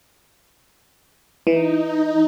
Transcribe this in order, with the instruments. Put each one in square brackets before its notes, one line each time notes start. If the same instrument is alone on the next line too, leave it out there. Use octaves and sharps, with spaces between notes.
[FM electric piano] E3 [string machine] D#4